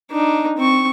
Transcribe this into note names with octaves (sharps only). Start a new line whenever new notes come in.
D4 D#4
C4 C#6